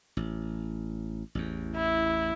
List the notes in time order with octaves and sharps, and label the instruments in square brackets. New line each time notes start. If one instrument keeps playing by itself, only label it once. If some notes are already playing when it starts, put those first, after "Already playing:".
[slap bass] A1
A1 E2
[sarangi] E4